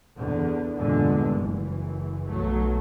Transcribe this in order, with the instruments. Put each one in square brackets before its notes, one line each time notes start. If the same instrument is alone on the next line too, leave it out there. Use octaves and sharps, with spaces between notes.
[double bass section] E2 D3
E2 G2 A#2 D3 G#3
F#1 E3
B1 F#3 A3